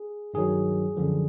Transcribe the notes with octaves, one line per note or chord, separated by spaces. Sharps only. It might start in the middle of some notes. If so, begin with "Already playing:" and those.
Already playing: G#4
G2 D#3 F#3 G#4
F#2 D3 F3